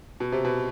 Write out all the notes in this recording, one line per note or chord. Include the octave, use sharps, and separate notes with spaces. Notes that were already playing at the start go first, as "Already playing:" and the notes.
B2
C3
B2